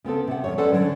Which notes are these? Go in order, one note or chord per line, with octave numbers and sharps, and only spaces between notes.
C#3 B3 C4 A4
C3 F#5
F2 A#2 C#5
C#4 A4 B4 C5 D5 F#5
D3 F#3